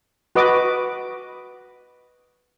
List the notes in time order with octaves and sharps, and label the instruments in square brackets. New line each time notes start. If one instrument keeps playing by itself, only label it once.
[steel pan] F#4 B4 D#5 D6